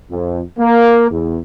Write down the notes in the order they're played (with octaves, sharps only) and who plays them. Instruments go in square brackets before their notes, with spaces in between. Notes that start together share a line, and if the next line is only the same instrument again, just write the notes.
[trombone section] F2
A#3
E2